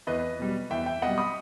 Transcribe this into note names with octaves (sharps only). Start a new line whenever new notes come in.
E2 B4 D#5
B2 G3
E2 E5 G5
E5 G5
B2 G3 D#5 F#5
B5 D#6